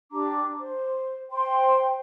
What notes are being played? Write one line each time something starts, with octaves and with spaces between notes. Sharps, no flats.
D4 G4 A#5 D6
C5
C5 G5 C6